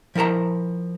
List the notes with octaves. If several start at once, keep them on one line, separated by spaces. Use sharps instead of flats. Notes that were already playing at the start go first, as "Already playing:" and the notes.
F3 E4 A#4 A5 A#5